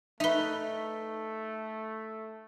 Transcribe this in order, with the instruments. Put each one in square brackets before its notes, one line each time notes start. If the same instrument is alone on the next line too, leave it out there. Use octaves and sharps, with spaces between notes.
[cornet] A3 [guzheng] D#4 B4 [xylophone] E5 G7